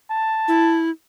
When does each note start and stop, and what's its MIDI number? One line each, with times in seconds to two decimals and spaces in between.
0.10 0.82 81
0.48 0.90 64